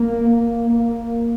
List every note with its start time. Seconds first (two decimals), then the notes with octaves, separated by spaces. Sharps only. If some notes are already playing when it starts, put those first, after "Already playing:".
Already playing: A#3
0.29 A#3
0.69 A#3